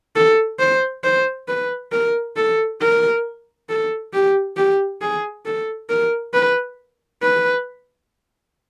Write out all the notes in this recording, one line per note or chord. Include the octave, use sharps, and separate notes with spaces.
A4
C5
C5
B4
A#4
A4
A#4
A4
G4
G4
G#4
A4
A#4
B4
B4